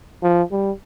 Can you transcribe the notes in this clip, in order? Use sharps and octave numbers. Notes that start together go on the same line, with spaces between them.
F3
G3